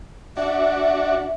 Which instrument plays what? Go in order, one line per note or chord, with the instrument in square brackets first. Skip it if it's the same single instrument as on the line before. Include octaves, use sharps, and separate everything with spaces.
[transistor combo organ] D4 F#4 [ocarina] E5